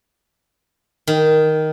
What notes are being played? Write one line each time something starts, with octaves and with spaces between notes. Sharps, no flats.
D#3